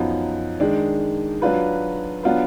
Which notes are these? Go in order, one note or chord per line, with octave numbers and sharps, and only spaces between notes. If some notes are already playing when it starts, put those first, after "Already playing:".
Already playing: F#2 F3 B3 D#4
D#3 G#3 D4
F#3 D4 F4 B4
F#3 B3 D4 F4 B4